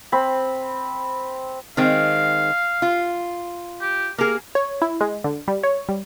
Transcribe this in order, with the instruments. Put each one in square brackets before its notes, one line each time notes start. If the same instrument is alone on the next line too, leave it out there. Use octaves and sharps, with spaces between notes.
[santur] C4 B5
[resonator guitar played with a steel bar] D#3 G#3 C4 [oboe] F5
[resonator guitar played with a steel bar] F4
[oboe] G4
[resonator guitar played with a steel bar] A#3 G#4 [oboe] A#4
[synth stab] C#5
E4
G#3
D3
G3
C#5
G3